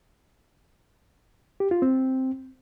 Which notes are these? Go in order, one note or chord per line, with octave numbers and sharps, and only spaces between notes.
G4
F4
C4